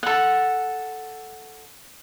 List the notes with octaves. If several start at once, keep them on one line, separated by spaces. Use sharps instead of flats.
A4 F#5